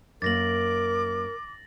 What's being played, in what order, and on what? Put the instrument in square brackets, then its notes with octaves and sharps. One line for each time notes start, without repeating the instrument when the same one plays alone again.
[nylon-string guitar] F#2 A#3 [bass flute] A#4 [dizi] D6 [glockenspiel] A6 A#6 F#7